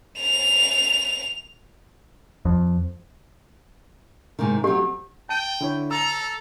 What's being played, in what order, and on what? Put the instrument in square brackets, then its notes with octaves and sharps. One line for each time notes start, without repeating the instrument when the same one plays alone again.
[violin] F7
[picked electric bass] F2
[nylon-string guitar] G#2 C3 D#3
[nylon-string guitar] F#3 C4 [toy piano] G4
[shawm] G5 [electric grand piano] A5 D#7
[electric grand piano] D3 E4 C#5
[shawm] A4 [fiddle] A#5 [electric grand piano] E6